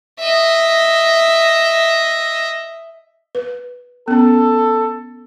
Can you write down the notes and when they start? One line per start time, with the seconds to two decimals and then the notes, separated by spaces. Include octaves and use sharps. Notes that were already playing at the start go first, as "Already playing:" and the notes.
0.20 D#5 E5
3.35 B4
4.08 B3 C#4 A4